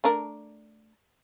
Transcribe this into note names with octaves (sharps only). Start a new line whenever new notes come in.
A3 D4 A#4